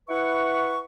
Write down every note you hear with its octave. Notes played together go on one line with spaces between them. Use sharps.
E4 B4 F#5 C#6